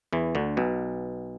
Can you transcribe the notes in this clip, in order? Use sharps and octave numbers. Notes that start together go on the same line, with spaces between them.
E2 E3
D2 D3
B1 B2